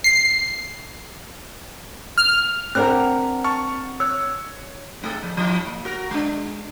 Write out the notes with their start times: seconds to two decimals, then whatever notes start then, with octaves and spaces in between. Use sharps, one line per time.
0.04 C7
2.18 F6
2.75 C4 D4 A#4 F#5 B5 F6 F#6
3.44 A5 C#6 F6
4.00 C#5 E6 F#6
5.02 G#2 A3 A4
5.23 F3
5.37 F3 E4
5.66 A#3
5.85 F#4 A#4
6.11 G#3 D4